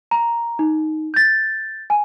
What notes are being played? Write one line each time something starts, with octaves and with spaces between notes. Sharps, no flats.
A#5
D#4
G6 A6
G#5